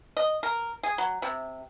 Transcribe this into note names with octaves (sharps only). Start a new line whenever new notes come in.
D#5
A#4
G#4
F#3
C3